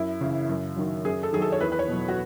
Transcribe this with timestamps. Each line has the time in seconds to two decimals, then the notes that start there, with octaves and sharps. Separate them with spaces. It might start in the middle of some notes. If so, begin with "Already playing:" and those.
Already playing: F#2 E4
0.21 C#3 E3
0.49 F#2
0.76 D#3 F#3
1.05 F#2 G#4
1.23 A4
1.33 D#3 F#3 G#4
1.42 A4
1.52 C#5
1.61 E2 B4
1.72 B4
1.79 C#5
1.88 B2 F#3
2.08 F#4